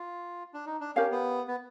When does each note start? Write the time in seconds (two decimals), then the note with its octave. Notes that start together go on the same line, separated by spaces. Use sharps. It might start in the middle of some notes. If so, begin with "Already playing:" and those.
Already playing: F4
0.54 D4
0.66 D#4
0.81 D4
0.95 C#4 G4 A#4 C#5 F5
1.11 B3
1.48 B3